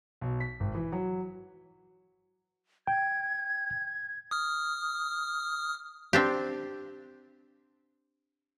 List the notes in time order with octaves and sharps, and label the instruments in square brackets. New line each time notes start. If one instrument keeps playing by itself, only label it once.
[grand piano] B1
B6
G#1
E3
F#3
[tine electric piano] G5 [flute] G#6
[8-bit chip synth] D#6 F6
[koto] C4 D4 G4